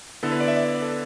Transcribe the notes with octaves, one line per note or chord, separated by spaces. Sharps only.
D3 B3 E4 A4
B4
D5
E5
D5
E5
D5
A4